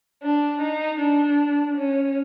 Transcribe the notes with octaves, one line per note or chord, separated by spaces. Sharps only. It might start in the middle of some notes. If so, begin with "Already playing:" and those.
D4
D#4
D4
C#4